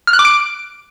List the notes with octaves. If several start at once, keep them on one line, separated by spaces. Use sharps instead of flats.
F6
F#6
D6
D7